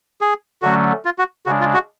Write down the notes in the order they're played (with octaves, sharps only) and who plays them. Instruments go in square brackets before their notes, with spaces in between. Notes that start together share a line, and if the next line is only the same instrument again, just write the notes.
[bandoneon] G#4
[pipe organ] D3 F#3 A3 C#4 [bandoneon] F#4
[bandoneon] F4
F#4
[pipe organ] C#3 [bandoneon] F#4
[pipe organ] G#3 D4
[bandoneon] F4
F#4